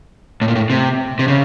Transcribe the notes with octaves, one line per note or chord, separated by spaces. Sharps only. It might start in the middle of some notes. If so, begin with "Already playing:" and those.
A2
A#2
A2
C3
C3
C#3